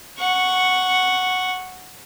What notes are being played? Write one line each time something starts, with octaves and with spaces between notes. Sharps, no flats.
F#5 C#6